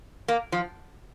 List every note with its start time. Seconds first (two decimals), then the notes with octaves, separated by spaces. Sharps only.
0.28 A#3
0.52 F3